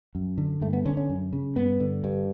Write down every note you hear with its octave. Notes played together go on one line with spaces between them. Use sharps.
F#2
D3
G2 A3
B3
D3 C#4
C#4
F#2
C#3
G2 B3
D3
G2